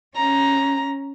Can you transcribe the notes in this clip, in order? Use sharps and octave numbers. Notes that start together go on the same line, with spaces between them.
C#4 A#5